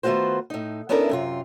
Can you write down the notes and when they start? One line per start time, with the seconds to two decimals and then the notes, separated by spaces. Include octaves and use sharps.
0.03 D#3 A3 B3 F4 F#4 C5
0.50 A2 D#4
0.89 B3 C#4 D4 E4 A4 A#4
1.09 F#2 C3 F4